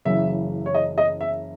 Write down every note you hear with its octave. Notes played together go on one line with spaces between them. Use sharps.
F#1 F#2 C#3 E3 E5
C#5
D#5
D#5
E5